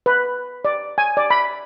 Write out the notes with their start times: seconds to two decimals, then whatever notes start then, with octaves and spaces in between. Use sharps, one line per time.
0.06 B4
0.65 D5
0.98 G#5
1.17 D5
1.30 B5